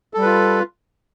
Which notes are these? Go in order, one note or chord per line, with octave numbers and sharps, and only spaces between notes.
G3 F4 A4 B4